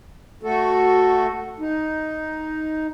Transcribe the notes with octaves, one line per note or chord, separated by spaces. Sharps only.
A3 F#4 A4
D#4